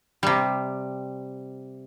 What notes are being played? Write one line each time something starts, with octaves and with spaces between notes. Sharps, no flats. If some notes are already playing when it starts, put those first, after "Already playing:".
C3 G3